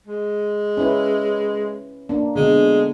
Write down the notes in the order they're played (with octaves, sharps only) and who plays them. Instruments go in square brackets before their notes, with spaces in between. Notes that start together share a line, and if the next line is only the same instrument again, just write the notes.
[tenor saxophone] G#3
[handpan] C#4 E4 B4
A#3 D4
[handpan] B2 D3 [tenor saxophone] G#3